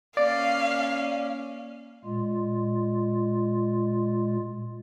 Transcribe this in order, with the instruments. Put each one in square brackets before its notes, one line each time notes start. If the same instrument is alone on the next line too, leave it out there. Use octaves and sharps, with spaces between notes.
[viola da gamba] A#3 C#4 [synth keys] D5 [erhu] F5
[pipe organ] A#2 G#3 F4